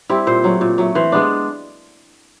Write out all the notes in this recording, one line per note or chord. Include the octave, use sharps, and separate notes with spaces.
G3 C4 E4
A#2 C5
F#3 A3
A#2
F#3 A3
E3 C5
G#3 B3 D4